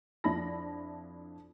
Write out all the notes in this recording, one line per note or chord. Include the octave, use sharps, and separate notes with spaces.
F2 F3 D4 E4 B5 A#6